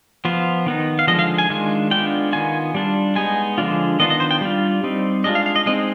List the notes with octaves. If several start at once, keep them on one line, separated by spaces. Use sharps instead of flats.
F3 B3 F4
D#3 B3 D#4
F5
D3 F3 G#3 D#5
F5
G#5
D#3 G#3 D4 F4
G#3 B3 D4 F4 G5
D#3 B3 F4 G#5
G3 D4 F4
G#3 B3 D#4 G#5
D3 F3 G#3 D4 F4
D#3 B3 D4 F4 D#5
D#5
C5
G5
G3 D4 F4
G3 C4 D#4
G#3 D4 F4 D#5
F5
F5
D#5
G#3 C4 D#4 D#5